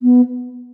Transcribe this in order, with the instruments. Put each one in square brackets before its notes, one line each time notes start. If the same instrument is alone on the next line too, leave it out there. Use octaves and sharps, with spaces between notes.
[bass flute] B3